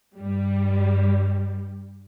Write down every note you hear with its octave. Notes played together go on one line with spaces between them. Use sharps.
G2 G3